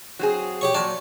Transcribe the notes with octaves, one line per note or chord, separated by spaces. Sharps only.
F#3 C4 G#4
G4 C#5 C#6
A#2 F#3 D5 A5